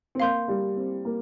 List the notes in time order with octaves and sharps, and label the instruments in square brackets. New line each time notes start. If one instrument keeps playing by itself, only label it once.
[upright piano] C4
[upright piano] A#3 [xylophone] F5 C6 G6
[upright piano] G3
C4
A#3